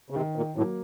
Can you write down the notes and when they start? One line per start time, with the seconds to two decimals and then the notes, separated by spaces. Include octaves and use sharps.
0.10 C#3
0.15 C3 D#3
0.36 A#2
0.56 A2 F#3 A#3